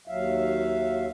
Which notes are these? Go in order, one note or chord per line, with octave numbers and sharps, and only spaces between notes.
D#2 F#3 E5 F5